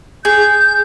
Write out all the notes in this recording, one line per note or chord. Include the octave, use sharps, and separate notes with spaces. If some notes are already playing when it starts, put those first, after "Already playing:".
G#4 G6